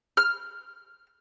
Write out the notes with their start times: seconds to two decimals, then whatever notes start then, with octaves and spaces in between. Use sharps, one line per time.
0.17 F6